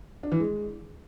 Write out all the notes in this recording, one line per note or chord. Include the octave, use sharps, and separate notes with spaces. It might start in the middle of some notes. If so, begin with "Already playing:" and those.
D4
E3
G#3